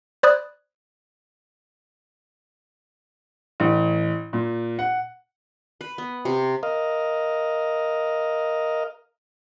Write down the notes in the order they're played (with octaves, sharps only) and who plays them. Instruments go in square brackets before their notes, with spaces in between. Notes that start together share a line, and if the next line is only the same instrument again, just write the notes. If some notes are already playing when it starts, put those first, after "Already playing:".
[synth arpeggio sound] C5 D5 B5 D#6 F#6 G#6
[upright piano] A1
A#2
F#5
[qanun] B4
B3
C3
[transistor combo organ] A#4 D#5 F5